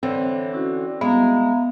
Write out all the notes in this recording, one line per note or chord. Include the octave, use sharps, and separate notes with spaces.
D3 E3 C4 C#5 E5
C#4 E4 F#4
G#3 B3 E5 F5 A#5